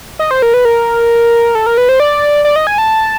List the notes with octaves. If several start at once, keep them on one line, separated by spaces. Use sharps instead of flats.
D#5
C5
A#4
B4
A#4
A4
A#4
B4
C5
D5
D5
D#5
G#5
A5